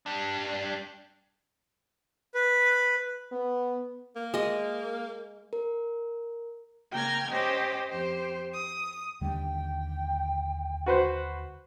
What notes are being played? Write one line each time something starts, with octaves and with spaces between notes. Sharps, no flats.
G3 D4
B4
B3
A#3
G#3 D#5
A#4
C#3 A#3 G5 A#5 F6 G#6
C#4 G4 C5 D#5 G5
F2 G4 C5
D#6
D#2 D3 G3 G5
F#4 B4 C5